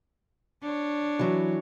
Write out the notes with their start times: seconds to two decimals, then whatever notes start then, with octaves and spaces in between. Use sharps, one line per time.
0.62 D4 C#5
1.19 E3 F#3